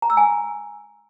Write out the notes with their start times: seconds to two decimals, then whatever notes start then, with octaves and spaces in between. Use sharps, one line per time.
0.02 A#5
0.10 E6
0.17 G#5